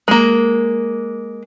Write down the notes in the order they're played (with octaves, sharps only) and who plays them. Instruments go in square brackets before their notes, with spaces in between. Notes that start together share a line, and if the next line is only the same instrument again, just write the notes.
[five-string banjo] G#3 A#3